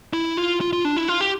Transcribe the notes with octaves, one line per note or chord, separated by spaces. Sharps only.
E4
F4
F4
F4
D4
E4
F4
G4